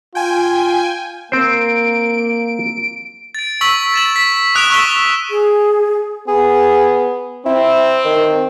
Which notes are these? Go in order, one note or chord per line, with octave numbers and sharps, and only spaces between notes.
F4 G5 G#5
A#3 C4 C5 D7
A6 D7
C#6 E6 B6 F#7
A6 E7 F#7
B6
D#6 F#6 B6 D7 E7 F7
C#6 E6 F#6 B6 E7 G7
G#4
B3 G#4
C4 E4
D#3